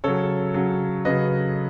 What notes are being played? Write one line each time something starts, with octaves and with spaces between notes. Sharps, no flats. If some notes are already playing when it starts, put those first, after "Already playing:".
C#3 F#3 A4 C#5
C#3 F#3
C#3 F#3 B4 D#5